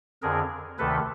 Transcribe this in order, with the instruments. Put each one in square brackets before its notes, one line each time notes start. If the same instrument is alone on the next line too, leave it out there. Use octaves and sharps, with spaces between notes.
[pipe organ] F2 D3 G#4 A#4
D2 C3 D#3 A4 B4